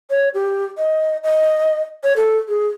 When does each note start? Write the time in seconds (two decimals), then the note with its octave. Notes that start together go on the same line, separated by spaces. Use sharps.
0.10 C#5
0.34 G4
0.78 D#5
1.24 D#5
2.04 C#5
2.16 A4
2.48 G#4